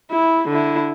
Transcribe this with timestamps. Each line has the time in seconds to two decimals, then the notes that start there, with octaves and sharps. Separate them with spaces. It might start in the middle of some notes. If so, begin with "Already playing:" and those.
0.11 E4
0.49 D3 E4